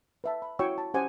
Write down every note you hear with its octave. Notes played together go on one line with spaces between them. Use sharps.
B4 E5 A5
B5
E4 F#4 C#5 G5 C#6 E6
A5
C#4 G4 C5 F#5 G#5 D6